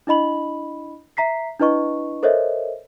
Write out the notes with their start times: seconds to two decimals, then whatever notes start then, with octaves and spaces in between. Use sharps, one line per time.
0.07 D4 E4 D#5 B5 F#7
1.17 E5 A#5 B6 C7
1.60 D4 E4 B4 D#5 C#6
2.23 A4 A#4 C5 C#5 D#5 E5